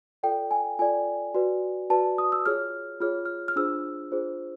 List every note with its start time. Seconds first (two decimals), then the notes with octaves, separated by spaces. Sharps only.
0.23 F4 A4 D5 G5
0.51 G#5
0.79 F4 A4 D5 G#5
1.35 F#4 B4 D5
1.90 F#4 B4 D5 A5
2.18 D#6
2.32 E6
2.46 F4 G#4 C#5 F6
3.01 F4 G#4 C#5 F6
3.25 F6
3.48 F6
3.56 D4 F4 G#4 C5 E6
4.12 D4 F4 G#4 C5